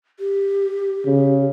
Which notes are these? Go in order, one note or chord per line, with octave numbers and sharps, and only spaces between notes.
G4
C#3